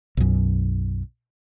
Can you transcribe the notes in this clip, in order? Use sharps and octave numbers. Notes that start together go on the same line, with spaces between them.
B1 F#2